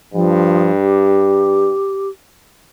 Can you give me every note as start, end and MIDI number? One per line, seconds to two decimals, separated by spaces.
0.14 1.72 43
0.14 0.71 53
0.81 2.09 67